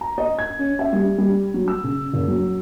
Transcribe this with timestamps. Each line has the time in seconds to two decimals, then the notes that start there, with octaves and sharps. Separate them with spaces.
0.01 A#5
0.18 D#5
0.39 G#6
0.59 C#4
0.79 E5
0.93 G3
1.18 G3
1.54 F#3
1.68 E6
1.84 C#3
2.13 F#1
2.28 F#3